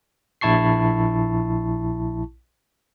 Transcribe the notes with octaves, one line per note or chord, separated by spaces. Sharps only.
A#1 E4 A5 C#6 C7